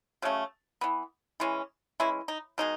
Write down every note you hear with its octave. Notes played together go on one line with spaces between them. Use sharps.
C#3 F#3 A3 C#4
E3 B3
E3 G#3 C#4
E3 G#3 C#4 E4
D#4
B2 G#3 D#4